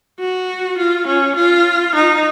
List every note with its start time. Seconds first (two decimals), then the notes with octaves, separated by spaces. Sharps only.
0.19 F#4
0.78 F4
1.07 C#4
1.36 F4
1.95 D#4